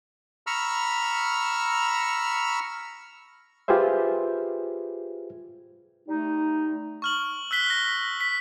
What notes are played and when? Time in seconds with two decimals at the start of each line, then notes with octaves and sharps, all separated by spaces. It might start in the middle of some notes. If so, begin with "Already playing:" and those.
0.47 A#5 B5 C#6 E6 F6
3.68 F4 G4 G#4 B4 C5 E5
6.07 G3 A3 D#4
7.02 C#6 F6 F#7
7.51 E6 F#6 B6 G7
7.70 A#6
8.20 B6